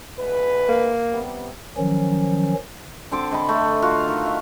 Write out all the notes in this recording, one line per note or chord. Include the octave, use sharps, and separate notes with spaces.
D2 G#3 B4
A#3
C3 G3 B3
D#3 F3 F#3 C#4
D3 C4 A5 D6
D3 D#5 G5 B5
A3
F4 F#4 F5
D#3
E5